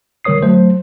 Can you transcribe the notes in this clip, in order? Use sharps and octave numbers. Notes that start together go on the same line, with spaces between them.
D3 G3 A#4 C#5 D#6 C7
F#3 A3 C5